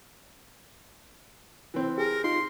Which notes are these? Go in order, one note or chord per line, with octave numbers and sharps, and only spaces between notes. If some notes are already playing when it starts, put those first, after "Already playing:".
E3 C4
G4 G#4 A#4
D#4 F4 C6